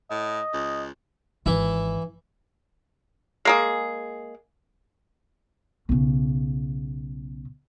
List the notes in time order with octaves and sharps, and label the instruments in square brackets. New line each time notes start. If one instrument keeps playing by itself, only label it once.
[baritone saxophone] A2 [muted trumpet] D#5
[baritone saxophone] C#2
[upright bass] G#1 [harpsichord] E3 E4
[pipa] G#3 A#3 G#4
[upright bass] B1 C#3